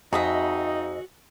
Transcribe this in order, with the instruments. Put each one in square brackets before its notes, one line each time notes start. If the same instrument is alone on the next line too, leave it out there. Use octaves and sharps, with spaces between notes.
[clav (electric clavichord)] F2 [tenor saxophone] D#4 [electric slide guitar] F#4 [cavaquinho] G#4 D#5 E5